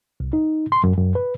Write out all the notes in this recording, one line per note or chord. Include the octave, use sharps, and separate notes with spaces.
C2
D#4
C6
F#2
F#2
B4